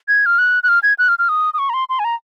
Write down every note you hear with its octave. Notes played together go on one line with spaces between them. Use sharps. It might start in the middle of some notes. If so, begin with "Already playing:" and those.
G#6
F6
F#6
F#6
F6
G#6
F#6
F6
F6
D#6
D#6
C#6
A#5
C6
C6
G#5
A#5